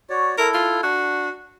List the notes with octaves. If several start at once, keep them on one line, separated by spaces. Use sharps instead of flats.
F#4 C#5 D5
E4 A4 A#4
F4
D4 F#4